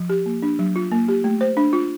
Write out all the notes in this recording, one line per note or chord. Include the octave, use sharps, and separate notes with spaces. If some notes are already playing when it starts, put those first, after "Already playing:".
Already playing: F3
G4
A#3
D4
F#3
F4
A#3
G4
A3
C5
D4
F4